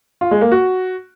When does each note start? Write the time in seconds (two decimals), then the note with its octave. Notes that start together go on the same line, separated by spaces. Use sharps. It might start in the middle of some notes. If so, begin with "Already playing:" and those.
0.21 F4
0.31 G#3
0.41 A#3
0.52 F#4